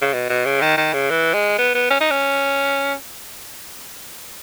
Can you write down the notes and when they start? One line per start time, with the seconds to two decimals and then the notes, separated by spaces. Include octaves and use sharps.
0.01 C#3
0.13 B2
0.29 B2
0.45 C#3
0.61 D#3
0.77 D#3
0.93 C#3
1.10 E3
1.34 G#3
1.58 B3
1.75 B3
1.90 C#4
2.01 D#4
2.11 C#4